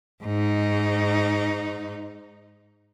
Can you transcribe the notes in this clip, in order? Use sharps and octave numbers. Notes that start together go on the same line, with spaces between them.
G#2 D#4